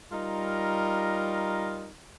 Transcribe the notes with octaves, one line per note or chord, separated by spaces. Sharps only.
G3 D#4 F4 A#4